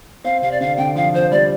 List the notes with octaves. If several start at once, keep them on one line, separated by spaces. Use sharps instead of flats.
C4 F5
C3 F5
D5
D3 F5
D3 G5
F3 F5
F3 C5
G3 D5